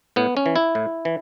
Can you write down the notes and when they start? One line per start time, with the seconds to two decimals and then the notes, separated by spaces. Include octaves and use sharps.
0.16 A2 B3
0.37 C#4
0.46 E3
0.56 E4
0.75 A2
1.05 E3